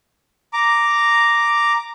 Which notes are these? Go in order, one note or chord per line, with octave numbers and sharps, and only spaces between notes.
A#5 D6